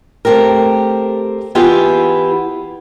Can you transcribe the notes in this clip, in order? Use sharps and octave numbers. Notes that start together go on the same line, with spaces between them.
A3 C4 G4 A#4
E3 B3 E4 F4 G4 G#4